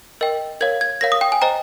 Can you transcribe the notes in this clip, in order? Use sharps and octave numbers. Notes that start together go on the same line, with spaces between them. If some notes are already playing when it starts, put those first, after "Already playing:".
A#4 D#5 G5
A#4 C#5 F5 G#6
G#6
A#4 C#5 F5 A#6
D#6
G5
G#5
C5 D#5 G5 A#5